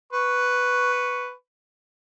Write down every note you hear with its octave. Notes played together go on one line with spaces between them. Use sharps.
B4 C#6